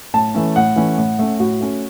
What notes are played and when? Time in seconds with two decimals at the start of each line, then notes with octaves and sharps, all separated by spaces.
0.14 A2 A5
0.35 E3 A3 C#4
0.56 A2 F#5
0.76 E3 A3 C#4
0.98 A2
1.19 A3 C#4
1.40 A2 F#4
1.60 A3 C#4